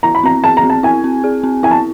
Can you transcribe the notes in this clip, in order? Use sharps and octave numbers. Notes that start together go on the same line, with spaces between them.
E4 A#5
B5
C4 A#5
G#4 A5
A#5
C4
A5
E4 G#5
C4
G#4
C4
E4 G#5
A5